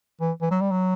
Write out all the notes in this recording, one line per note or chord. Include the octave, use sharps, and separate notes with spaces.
E3
E3
F#3
G3
F#3